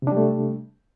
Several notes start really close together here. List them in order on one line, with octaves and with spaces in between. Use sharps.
C3 D4 G3 A3